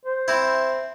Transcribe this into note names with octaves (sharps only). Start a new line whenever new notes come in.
C5
C4 E4